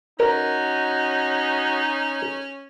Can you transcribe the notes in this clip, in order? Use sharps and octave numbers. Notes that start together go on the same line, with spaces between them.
C#4 D#4 F#4 A#4 D#5